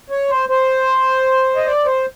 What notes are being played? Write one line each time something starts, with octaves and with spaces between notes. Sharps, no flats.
C#5
C5
C5
D#5
D5
C5